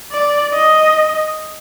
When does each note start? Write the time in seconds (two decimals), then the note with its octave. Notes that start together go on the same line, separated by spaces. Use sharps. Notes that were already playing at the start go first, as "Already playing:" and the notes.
0.12 D5
0.54 D#5